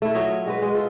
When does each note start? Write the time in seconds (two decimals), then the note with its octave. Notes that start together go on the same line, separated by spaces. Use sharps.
0.02 A3 E4
0.15 F#3 F4 C#5 D#5
0.46 G#3 F#4 B4
0.62 G#3
0.75 F4 A4